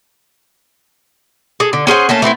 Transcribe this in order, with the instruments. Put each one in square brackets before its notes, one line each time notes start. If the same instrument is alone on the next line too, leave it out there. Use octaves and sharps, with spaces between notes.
[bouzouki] G#4 A4
D3
C#4 G#4 C5 F#5
A3 A#3 C#4 A5
A3 B3 C4 E4